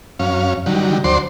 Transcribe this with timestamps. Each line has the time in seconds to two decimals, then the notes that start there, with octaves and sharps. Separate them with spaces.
0.19 F#2 C#4 F5
0.66 D3 D#3 F#3 G3
1.04 D2 F#3 C5 D5 C6